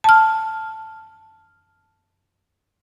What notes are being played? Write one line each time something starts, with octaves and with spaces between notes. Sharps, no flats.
A5 F6